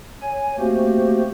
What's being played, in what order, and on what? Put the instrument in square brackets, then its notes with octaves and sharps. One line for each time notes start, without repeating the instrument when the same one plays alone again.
[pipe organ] C#5 G#5
A3 A#3 C4 F#4 G4 C5